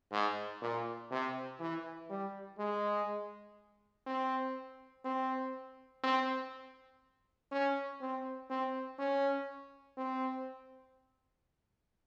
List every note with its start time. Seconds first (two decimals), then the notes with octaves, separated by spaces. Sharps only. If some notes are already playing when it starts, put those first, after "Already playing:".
0.12 G#2
0.62 A#2
1.11 C3
1.60 E3
2.10 G3
2.58 G#3
4.06 C4
5.05 C4
6.03 C4
7.51 C#4
8.01 C4
8.50 C4
8.99 C#4
9.97 C4